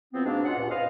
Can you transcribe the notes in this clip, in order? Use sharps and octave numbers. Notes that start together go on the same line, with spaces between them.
E2 F3 B3 C4
G#2 B2 G#3 A#3 D4
C#2 C#4 F4 F#5
C#2 G2 A#2
B3 C5 D#5 F5